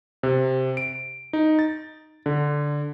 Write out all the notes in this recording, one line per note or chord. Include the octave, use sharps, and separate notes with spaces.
C3
D7
D#4
A6
D3